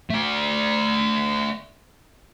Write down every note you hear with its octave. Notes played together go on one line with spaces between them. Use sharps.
A3 D5